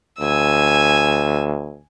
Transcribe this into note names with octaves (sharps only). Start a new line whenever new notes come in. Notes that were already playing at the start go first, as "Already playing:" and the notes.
D2 G#5 E6